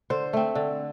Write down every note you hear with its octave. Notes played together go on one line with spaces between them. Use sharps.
D3 C5
A3 C4
D3